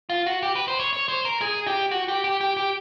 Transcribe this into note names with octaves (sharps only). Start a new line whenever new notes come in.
F4
F#4
G4
B4
C5
C#5
C#5
C5
A#4
G#4
G4
F#4
G4
G4
G4
G4